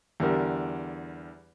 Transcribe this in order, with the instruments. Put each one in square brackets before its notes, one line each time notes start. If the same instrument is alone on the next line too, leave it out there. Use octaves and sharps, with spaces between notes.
[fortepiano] E2 D3 G3 A#4